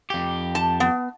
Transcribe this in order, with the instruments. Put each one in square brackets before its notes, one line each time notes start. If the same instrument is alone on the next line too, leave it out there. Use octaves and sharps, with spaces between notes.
[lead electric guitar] F2 G4
[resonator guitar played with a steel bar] A5
B3